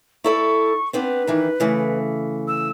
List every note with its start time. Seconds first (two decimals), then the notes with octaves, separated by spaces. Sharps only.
0.24 E4 A4 D5 C#6
0.93 B3 C4 D4 B4
1.27 D#3 E3 D4
1.60 C#3 E3 A3
2.48 E6